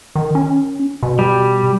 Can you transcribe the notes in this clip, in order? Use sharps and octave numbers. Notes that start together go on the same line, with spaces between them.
D#3
C#4
B2
G3